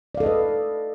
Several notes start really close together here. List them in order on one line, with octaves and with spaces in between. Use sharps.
D5 F5 A4 D#5 B4